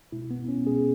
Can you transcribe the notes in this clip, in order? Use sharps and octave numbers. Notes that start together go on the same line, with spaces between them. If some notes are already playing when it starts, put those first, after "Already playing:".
B2 G#3 E4
B3
C#4
B2 G#3 G#4